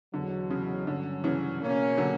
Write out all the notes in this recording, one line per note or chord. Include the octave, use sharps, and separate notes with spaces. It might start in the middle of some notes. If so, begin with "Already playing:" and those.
E2 B2 D3 F#3
C#3
G2 D3 F#3 C#4
C#3 E3
B2 A#3 C#4
D3 F#3